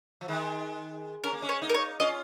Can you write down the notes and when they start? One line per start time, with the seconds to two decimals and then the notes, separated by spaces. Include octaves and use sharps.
0.21 F3
0.28 D#3 G#3
1.24 C#4 A#4
1.33 A#3
1.42 G#3 C#4
1.49 C#5
1.62 A#3 D#4
1.69 A#4
1.74 C#5
2.00 C#4 F4 D#5